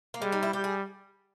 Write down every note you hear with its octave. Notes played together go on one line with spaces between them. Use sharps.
A#3
G3 G#3
D#4
E4
G3 G4
G#4